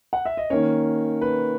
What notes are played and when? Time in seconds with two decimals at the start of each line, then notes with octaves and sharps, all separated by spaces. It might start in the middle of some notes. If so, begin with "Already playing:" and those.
0.13 F#5
0.25 E5
0.37 D#5
0.50 D#3 A#3 C#4 C#5
1.21 B4